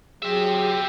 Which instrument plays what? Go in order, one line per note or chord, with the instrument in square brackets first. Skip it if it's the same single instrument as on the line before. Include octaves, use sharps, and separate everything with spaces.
[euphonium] F#3 [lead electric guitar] G4 E5 [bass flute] G#4